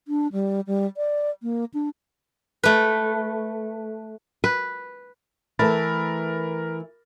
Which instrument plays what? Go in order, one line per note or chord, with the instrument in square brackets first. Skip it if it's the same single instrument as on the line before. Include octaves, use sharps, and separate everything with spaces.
[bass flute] D4
G3
G3
D5
A#3
D4
[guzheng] A3 B4
[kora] B4
[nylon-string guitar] E3 A3 [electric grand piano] A#4 B5 A6